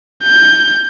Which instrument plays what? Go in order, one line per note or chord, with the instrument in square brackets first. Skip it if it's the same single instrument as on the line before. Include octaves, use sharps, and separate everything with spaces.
[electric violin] G6